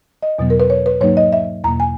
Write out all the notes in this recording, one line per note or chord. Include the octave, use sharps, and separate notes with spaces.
D#5
E2 B2 F#3 B3
A#4
B4
C#5
B4
G#2 F#3 A#3 D#4 C#5
D#5
E5
E2 B2 A#3 A#5
G#5